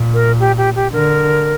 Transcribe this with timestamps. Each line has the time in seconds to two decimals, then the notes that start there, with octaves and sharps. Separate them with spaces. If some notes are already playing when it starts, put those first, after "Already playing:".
Already playing: A#2
0.14 A#4
0.40 G4
0.58 G4
0.76 G4
0.93 D3 A#4